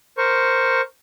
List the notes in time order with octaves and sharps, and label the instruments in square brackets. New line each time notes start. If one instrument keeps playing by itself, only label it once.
[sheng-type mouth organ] A#4 C5 C#6